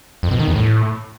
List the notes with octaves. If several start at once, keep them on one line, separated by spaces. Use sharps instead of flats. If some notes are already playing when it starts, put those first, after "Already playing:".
F2
B2
D#3
E2
A2